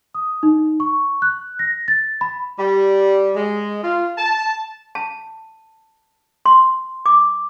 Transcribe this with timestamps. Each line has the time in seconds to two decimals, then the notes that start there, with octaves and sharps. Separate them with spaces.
0.14 D#6
0.43 D#4
0.80 C#6
1.22 F#6
1.59 A#6
1.88 A6
2.21 B5
2.58 G3
3.36 G#3
3.82 F4
4.17 A5
4.95 A5
6.45 C6
7.06 D6